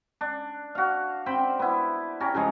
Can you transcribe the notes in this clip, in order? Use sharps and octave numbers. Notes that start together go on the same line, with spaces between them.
D4
F#4 F5
C4 C5 G5 B5
B3 E4
C#4 G4 A#5
C#3 F3 G#3 C#5